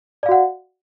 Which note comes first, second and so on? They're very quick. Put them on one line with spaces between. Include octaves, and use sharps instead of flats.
D5 F5 F#4 F#5